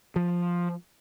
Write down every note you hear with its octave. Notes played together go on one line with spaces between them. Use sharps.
F3